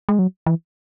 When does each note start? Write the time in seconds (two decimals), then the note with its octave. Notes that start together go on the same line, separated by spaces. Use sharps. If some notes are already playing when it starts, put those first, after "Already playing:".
0.09 G#3
0.19 F#3
0.46 E3